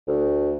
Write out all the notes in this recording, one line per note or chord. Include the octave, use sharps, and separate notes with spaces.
D2